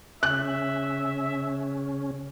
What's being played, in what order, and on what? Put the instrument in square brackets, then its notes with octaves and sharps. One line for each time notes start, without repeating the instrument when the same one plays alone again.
[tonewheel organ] C#3 C#4 [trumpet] E5 [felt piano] F#6